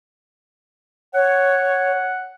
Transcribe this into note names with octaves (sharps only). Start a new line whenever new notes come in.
C#5 F#5